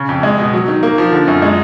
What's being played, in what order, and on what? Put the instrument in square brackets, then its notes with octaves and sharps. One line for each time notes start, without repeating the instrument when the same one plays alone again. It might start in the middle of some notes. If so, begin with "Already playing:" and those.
Already playing: [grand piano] C#3
F2
G#3
B2
F#3
D#3
A#3
F3
D3
F#2
G#3